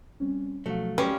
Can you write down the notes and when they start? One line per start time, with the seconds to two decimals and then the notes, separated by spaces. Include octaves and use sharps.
0.20 G3 C4 C#4
0.66 B2 F3 F#3 A3 F5
0.98 F3 G3 C#4 B4 D6